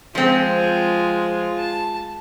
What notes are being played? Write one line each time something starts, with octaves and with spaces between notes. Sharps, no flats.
F3 G#3 C4 F4
A5